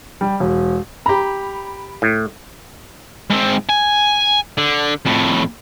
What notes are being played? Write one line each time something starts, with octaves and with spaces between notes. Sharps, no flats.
G3
E1
G4 A#5 B5
A2
G#2 C4
G#5
D3
F2 A2